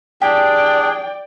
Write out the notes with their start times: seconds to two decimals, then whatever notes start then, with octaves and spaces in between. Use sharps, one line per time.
0.22 D4 G4 G#4 D5 G5